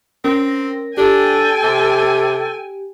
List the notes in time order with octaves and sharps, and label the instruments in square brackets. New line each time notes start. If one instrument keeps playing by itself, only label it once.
[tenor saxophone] C4 [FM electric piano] C#4 A#4 A#6
[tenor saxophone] D4 [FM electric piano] G4 [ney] A4 [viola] G5 G#5
[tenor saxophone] C3